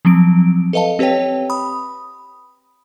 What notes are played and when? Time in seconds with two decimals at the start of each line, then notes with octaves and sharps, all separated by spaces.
0.05 F3 F#3 C4 D7
0.73 A4 B4 D#5 F5 A5
0.99 C4 G4 B4 C#5 G5
1.50 B5 D#6